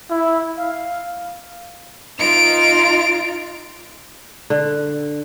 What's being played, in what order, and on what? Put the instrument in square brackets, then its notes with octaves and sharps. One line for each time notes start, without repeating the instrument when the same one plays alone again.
[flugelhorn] E4
F5
[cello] D#4 F4 [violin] D7 F7
[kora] D3